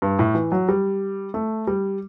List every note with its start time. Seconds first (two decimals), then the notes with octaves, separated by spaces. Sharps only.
0.02 G2
0.19 A2
0.35 E3
0.52 F#3
0.69 G3
1.34 A3
1.67 G3